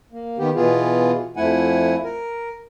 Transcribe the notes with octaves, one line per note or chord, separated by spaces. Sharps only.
A#3
D#3 B3 G4
B2 E3 B3 F4 G#4
F2 F3 A3 E4 F#5 G#5
A#4